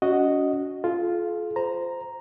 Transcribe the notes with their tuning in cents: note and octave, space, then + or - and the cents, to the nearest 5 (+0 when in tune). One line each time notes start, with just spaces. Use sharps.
C#4 +35 F#4 +0 D#5 +0
F4 +0 A4 -45
C5 -15 A#5 +0